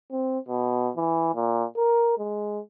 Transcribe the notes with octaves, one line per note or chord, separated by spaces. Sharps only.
C4
B2
E3
A#2
A#4
G#3